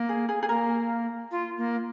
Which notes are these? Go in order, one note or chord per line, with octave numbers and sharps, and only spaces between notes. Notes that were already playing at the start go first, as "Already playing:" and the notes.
Already playing: A#3
G#4
G#4
G#4
A#3 A#4
F4
A#3